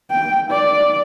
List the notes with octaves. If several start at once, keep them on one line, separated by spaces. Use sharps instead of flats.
G5
D5